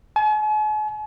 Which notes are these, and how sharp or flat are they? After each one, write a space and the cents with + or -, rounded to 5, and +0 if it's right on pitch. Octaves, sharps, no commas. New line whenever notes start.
G#5 +45